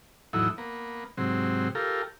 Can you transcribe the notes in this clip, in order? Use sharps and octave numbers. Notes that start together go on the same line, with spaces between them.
E2 A2 F#3 D#4 E4
A#3 B3
G#2 C3 F#3 C4
F4 G4 A4 A#4